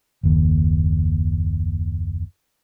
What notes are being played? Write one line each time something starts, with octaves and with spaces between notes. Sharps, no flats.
F#1 D#2